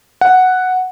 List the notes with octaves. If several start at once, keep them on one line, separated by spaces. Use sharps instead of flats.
F#5